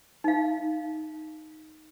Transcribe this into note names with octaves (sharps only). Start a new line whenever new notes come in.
D#4 F5